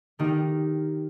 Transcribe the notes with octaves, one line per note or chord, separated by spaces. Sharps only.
D#3 A#3 D#4 G4